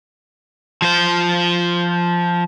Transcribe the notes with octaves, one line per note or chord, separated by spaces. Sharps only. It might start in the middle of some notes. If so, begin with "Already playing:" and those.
F3 C5